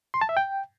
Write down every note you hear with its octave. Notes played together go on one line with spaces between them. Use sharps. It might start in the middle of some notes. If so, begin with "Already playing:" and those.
C6
A5
E5
G5